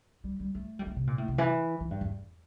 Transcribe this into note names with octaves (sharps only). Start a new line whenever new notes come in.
G3
G3
A3
G3
A3
C3
A#2
A2
C3
E3
E3
G2
E2